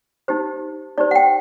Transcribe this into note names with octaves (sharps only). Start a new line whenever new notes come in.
D#4 G4 C5
D#4 G4 C5 D5
F#5
G5